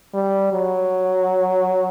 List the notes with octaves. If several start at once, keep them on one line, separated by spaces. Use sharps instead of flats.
G3
F#3